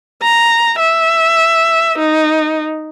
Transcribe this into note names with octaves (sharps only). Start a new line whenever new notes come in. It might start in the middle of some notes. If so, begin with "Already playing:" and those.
A#5
E5
D#4